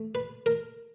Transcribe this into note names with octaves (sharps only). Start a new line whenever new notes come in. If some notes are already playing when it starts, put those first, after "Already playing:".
Already playing: A3
B4
A#4